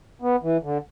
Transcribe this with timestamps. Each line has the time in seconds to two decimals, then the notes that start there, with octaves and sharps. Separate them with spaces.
0.22 B3
0.43 E3
0.63 D3